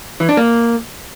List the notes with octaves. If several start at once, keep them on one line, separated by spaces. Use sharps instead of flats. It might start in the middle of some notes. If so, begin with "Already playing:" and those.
E3
D4
A#3